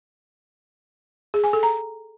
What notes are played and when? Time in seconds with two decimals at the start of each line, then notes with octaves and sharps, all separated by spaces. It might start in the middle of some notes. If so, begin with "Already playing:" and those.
1.34 G#4
1.44 G#5
1.53 A4
1.63 A#5